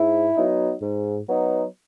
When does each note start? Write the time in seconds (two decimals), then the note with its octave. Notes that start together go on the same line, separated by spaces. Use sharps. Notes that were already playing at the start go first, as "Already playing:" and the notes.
Already playing: G#2 E4
0.37 F#3 B3 D#4
0.82 G#2
1.28 F#3 B3 D#4